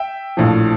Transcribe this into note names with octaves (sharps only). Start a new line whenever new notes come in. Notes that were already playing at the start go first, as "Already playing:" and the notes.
Already playing: E5 G5
A#1 A2 F3